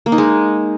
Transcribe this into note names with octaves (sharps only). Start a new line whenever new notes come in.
A#3
D#4
G#3